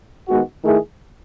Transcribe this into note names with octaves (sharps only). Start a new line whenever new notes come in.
D#3 G#3 B3 F#4
D#3 A3 E4 G#4